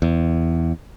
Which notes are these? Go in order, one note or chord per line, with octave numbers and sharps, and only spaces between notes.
E2